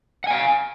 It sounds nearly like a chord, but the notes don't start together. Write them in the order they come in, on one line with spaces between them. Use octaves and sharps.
F#5 G#5 F5